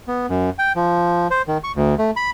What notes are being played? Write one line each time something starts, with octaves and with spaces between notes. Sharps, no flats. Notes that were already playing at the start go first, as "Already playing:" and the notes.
B3
F#2
G5
F3
C5
D#3
C#6
D2
A3
B5